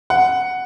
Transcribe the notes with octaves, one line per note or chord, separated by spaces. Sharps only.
F#5